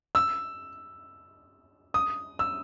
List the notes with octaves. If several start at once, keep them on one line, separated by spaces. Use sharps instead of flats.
E6
D#6
E6